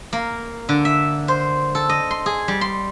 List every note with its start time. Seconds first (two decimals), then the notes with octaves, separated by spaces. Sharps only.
0.13 A#3
0.69 D3
0.85 E5
1.28 C5
1.75 A4
1.89 D#5
2.11 C6
2.26 G#4
2.48 G3
2.61 C6